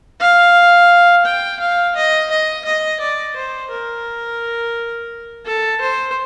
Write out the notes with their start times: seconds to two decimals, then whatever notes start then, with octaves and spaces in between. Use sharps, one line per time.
0.20 F5
1.26 G5
1.60 F5
1.95 D#5
2.31 D#5
2.65 D#5
3.00 D5
3.36 C5
3.71 A#4
5.46 A4
5.81 C5